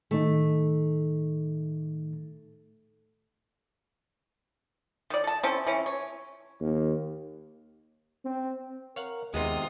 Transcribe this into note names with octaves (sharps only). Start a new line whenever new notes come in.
A2 D#3 A3 D#4
D#3 D5
A4 A5
C4 C#4 E4 A4
E3 C#4
C#5
D#2
C4
A#4 C#5 F5 F#5
D#2 C3 G#3 B3 D#4 F4 D#6